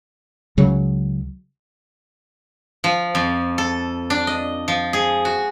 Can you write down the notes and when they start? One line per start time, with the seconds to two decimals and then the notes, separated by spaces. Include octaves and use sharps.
0.57 C#2 C#3 F#3
2.84 F3
3.15 F2
3.58 A4
4.10 D4
4.27 D#5
4.68 F3
4.93 G#4
5.25 F#4